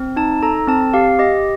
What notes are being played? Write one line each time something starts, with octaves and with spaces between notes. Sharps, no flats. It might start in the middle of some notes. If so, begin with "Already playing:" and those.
Already playing: C4
D#4 A5
A4 A#5
C4 A5
G4 F5
G4 D#5